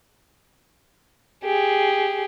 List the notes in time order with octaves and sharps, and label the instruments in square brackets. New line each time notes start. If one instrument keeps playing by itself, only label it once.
[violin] G4 G#4